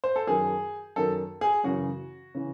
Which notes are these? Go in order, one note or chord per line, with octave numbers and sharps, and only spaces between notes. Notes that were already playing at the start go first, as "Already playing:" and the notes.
C5
A4
F#2 D#3 G#4
F#2 D#3 A4
G#4
F#2 C#3 E3 F#4
C#3 E3